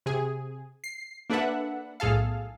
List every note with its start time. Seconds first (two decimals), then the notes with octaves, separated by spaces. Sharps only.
0.06 C3 G#4
0.84 C7
1.30 A#3 D4 A4 B4 E5 F#5
2.00 B1 A2 G#4 A4 F5